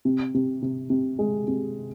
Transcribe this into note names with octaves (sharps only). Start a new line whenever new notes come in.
C3
C3
C3
C3
G#3
C3